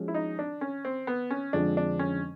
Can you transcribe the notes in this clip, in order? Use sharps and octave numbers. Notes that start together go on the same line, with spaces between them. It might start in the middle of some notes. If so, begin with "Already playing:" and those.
Already playing: F3 G#3 C#4 F#4
E4
D#4
D4
C#4
C4
B3
C#4
F2 D3 F3 G#3 C4 D4
D4
C#4